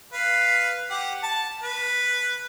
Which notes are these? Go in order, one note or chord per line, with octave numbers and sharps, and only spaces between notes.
B4 F5
G4 F#5
A5
B4